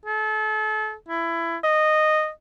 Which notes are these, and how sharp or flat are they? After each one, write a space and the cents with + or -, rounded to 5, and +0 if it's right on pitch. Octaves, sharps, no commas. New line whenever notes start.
A4 -35
E4 +20
D#5 -10